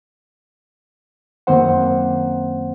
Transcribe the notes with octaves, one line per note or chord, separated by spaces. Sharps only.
F#2 D#3 A#3 C4 C5 F#5